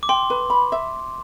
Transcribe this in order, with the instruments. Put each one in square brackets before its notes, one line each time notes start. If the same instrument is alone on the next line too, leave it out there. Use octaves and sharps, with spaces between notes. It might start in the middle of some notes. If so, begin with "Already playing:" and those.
[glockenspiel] D6
[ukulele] G5 [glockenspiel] C6
[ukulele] B4
B5
E5